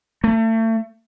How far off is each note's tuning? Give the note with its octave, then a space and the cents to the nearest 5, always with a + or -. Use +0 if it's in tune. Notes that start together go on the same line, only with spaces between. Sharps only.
A3 +35